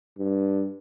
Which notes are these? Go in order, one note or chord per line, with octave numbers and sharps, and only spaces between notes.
G2